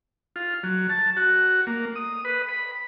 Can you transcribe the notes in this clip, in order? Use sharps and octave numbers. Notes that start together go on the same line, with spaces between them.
F4
F#3
A5
F#4
A#3
D#6
B4
B5